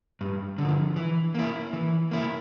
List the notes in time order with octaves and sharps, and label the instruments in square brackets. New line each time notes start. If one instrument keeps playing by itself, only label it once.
[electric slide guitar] G2
D3 F3
E3
A#3 E4
E3
A#3 E4